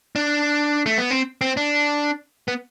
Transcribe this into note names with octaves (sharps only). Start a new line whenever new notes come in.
D4
A3
B3
C4
C4
D4
B3